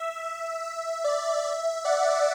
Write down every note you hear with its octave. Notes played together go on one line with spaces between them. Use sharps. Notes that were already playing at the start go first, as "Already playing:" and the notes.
Already playing: E5
E5
E5
D5
E5
D5 F#5